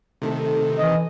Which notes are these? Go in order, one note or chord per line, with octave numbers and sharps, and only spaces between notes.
C3 D#3 A3 E4 A4
E3 D#5